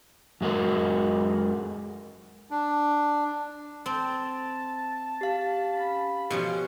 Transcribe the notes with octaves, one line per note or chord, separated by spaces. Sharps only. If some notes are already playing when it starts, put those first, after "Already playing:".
F#2 G#3 F#4 A#4
D4
C4 A5
G4 F5
C#4 B5
B2 F3 C#4 G4 C#6